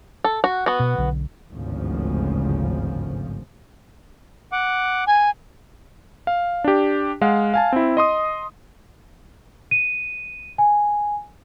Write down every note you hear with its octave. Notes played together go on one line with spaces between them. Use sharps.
A4
F#4
B3 F#4
B2
B1 D3
G#1 D2 G2 C#3 F3
F#5 D6
G#5
F5
D4 G4
G#3 F5 F#5
F5 G#5 A5
C4 E4
D#5 C6 D#6
D#7
G#5